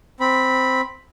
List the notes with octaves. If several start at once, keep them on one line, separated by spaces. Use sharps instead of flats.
C4 B5